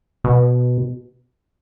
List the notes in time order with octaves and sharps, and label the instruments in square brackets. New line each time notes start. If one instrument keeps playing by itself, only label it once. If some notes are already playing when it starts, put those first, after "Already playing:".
[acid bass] B2